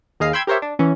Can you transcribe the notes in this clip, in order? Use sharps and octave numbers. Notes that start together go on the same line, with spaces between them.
D#2 G#4 D#5 F5 C7
G5 B5 C6 E6 G#6
G4 A#4 C5 C#5 E5
D4
E3 C#4